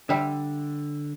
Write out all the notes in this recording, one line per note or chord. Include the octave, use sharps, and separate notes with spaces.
D3 G3 E5